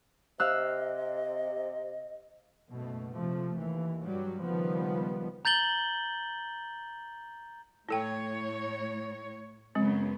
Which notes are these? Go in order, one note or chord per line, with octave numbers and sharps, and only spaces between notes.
C3 D#5 F5 E6 F#6
F#1 B2 A3
C3 F3 A3
D#2 E3
G2 F#3 G3
C#2 D#3 F3 G3 B3
A#5 G6 A6 F#7 G7
A2 E4 A4 C#5 G5
F#2 C#3 G#3 B3 C4